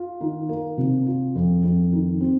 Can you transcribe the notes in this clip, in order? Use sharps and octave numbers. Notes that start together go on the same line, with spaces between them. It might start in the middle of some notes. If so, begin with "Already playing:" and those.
Already playing: F4
D#3
A#3
C3
F4
F2
F2
D#3
C4